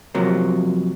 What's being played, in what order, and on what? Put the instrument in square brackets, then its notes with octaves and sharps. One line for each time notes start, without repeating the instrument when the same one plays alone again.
[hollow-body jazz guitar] C3 F3 F#3 A#3